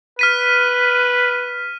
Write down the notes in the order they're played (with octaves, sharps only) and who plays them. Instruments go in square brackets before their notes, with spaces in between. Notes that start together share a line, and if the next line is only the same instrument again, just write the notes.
[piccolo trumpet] B4 [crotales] F6 B6 D#7